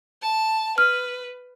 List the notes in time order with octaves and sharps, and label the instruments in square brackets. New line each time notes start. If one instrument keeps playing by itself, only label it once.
[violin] A5
[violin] B4 [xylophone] F6